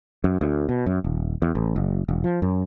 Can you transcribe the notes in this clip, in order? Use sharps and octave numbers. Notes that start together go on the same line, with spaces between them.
F#2
D2
B2
F#2
D#1
E2
A1
F#1
E1
F3
F#2